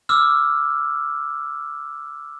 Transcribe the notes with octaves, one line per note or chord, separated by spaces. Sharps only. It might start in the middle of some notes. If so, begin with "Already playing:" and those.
D6 E6 F6